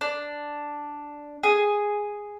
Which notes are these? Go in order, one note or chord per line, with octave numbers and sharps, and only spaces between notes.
D4
G#4